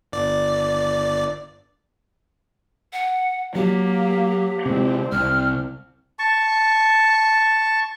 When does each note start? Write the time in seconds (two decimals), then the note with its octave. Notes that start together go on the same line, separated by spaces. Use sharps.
0.12 G1 D5
2.93 F#5
3.55 F#3 A#3 G4
4.66 C3 G#3 C4
5.12 C2 F6
6.19 A5 C#6